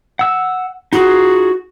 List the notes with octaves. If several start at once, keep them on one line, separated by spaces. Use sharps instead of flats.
F#5 E6
D#4 F4 F#4 G#4